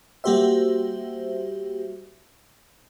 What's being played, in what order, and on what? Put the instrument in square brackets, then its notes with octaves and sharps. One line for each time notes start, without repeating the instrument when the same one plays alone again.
[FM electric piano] G3 A#3 F#4 G4 C5 E5